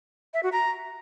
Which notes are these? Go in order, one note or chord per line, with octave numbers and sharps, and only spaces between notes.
E5
F#4
A#5